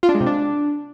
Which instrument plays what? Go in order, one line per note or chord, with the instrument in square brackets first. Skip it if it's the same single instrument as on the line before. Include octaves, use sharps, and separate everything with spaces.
[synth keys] F4
D4
G#3
C3
D4